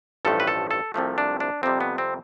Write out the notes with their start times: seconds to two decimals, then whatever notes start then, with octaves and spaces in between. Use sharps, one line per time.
0.25 A1 G2 F3 A3 A4
0.40 B4
0.47 A4
0.71 A4
0.94 C2 C3 F3 A3
1.18 D4
1.40 D4
1.63 F2 C3 G3 C4
1.81 B3
1.98 C4